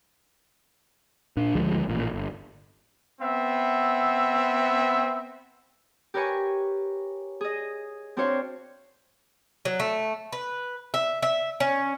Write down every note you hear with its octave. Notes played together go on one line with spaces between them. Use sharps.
A#2 D4
G#1 D2 F3 G#3
A1 A#2
G1
B3 C4 E5
G4 A#4 B4 C#5 G#5 C#6
G#4 D#5
C4 D4 F#4 C5 C#5 F5
F#3
A3
B4
E5
E5
C#4